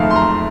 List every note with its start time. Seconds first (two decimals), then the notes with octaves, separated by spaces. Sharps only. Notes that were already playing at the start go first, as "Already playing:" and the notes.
Already playing: F#1 F2 D#3 A3 F5
0.10 C6
0.16 A#5